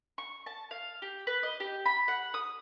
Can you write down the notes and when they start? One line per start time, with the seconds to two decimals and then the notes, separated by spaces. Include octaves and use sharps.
0.18 C#6
0.46 A5
0.71 F5
1.02 G4
1.27 B4
1.43 D#5
1.60 G4
1.86 B5
2.08 F#5
2.34 D#6